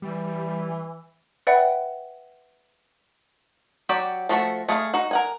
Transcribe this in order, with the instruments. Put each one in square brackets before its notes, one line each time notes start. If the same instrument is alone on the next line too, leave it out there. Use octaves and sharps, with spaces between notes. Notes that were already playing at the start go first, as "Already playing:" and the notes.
[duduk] E3 [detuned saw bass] G3
[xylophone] B4 D5 E5 F#5 G5 B5
[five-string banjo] F#3 F#4 G4 D5
F3 A3 F#4 A4 E5
A3 G#4 A#4 F5
D#4 F#4
A#4 F#5 G#5